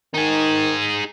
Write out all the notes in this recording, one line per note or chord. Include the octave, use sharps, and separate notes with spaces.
D#3 D#4 G#4